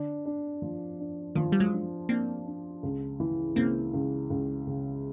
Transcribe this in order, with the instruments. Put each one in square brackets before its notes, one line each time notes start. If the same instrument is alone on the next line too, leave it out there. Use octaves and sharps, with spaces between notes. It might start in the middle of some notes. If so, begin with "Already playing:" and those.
Already playing: [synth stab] D3 [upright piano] D4
[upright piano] D4
F3
D4
[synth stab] D#3 [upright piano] F3
[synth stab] G3
F#3 G#3
[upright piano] D4
[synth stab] A#3 C4 [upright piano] D4
[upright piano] D4
C#2
E3
[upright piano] C#2 [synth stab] A#3 C4
[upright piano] C#2
C#2
C#3